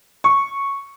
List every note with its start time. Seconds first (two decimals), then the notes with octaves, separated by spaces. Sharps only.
0.24 C#6